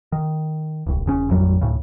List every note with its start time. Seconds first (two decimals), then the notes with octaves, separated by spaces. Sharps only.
0.12 D#3
0.87 D1 C2
1.06 E1 C#3 C#4
1.29 A1 F2 F#3 G3
1.61 D2 A2 C#3